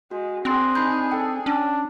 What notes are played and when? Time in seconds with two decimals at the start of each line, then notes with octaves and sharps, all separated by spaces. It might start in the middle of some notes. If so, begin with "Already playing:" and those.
0.11 G#3 F#4
0.45 C4 D4 G#4 C6 F#6 A#6
0.75 D#4 B5 G6
1.12 A4 G5
1.46 C#4 D4